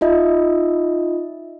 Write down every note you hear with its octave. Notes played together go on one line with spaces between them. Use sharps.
D#4 F4 D#5 E5